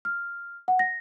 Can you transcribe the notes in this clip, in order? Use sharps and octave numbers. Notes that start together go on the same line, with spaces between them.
F6
F#5
A#6